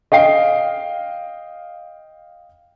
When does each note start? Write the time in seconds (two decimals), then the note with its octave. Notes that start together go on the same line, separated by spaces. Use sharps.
0.12 D#5 F5 G5 C7